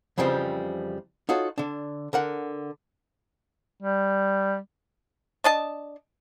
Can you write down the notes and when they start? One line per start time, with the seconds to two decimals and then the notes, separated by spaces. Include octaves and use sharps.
0.18 F2 C#3 E3 F3 G3 C4
1.29 D#4 F4 F#4 A4 C#5
1.58 D3 D4
2.13 D3 A#4 F#5
3.82 G3
5.44 D4 D#5 A5